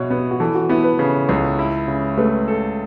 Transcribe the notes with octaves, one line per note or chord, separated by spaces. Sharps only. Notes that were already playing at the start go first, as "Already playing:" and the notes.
Already playing: B2 B3 E4 C#5
B3
F#4
E3 A4
F#4
B3 E4
B4
C#3
C#2
E4
C#3
A3 B4
A4